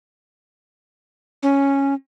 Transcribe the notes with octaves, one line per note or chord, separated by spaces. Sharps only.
C#4